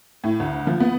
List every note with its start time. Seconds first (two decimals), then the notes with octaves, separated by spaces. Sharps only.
0.24 A2
0.40 D2
0.67 F3
0.80 B3